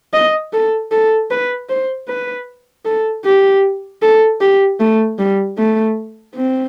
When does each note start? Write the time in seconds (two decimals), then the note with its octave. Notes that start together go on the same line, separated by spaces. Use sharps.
0.14 D#5
0.53 A4
0.92 A4
1.31 B4
1.69 C5
2.08 B4
2.85 A4
3.25 G4
4.02 A4
4.41 G4
4.80 A3
5.19 G3
5.57 A3
6.36 C4